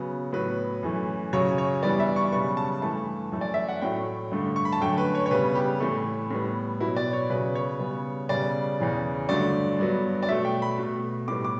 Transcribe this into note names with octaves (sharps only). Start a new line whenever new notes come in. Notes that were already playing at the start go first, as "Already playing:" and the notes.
Already playing: C#3 F#3 B3
A2 F#3 B3 B4
F#2 E3 A3
F#2 C#3 F#3 C#5
C#5
G2 E3 G3 B3 D5
E5
C#6
F#2 C#3 G3 B3 C#6
A5
G2 E3 A3 A5
F#2 E3 A3
D5
E5
F#5
A2 F#3 A3 G5
G2 D3 A3
C#6
B5
A5
F#2 D3 A3 G5
B4
C#5
C#5
C#3 G3 B3 B4
G4
A2 E3 A3
A2 G3 B3
B2 F#3 B3 E4
D5
C#5
C#3 F#3 B3 B4
C#5
C#3 G3 B3
C#3 G3 B3 D5
E2 C#3 E3
G2 D3 F#3 A3 D5
G2 F#3 B3
D5
B2 F#3 A3 E5
G5
B5
B2 A3
A2 G3 B3 D6
D6